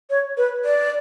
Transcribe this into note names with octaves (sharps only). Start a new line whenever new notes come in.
C#5
B4
D5